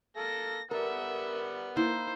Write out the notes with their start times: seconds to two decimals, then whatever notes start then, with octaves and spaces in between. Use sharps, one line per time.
0.17 A#3 A4 A#6
0.71 G3 B3 A4 A#4 E5 F#5
1.76 A#3 D#4 E4 C5